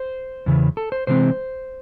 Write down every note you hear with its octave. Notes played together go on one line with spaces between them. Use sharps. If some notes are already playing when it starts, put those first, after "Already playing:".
Already playing: C5
E2 C#3 E3
A4
C5
C3 E3 G#3 C4 C5